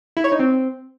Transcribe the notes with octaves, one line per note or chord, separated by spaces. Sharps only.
E4
C#5
D#4
C4